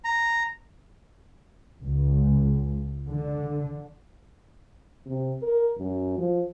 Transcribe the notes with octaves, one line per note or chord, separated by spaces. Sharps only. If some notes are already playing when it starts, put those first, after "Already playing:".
A#5
C#2
D3
C3
A#4
F#2
F3